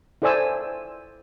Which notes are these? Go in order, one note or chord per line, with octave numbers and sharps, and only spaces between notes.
E4 A4 C5 D5 G#5 E6